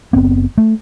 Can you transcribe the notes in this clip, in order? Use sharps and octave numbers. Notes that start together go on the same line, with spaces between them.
F#1 B3 C4
A3